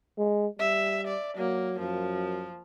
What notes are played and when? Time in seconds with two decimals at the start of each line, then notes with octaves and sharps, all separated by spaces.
0.18 G#3
0.59 G3 E5
1.07 D5
1.37 F#3 A#3
1.80 F#2 F3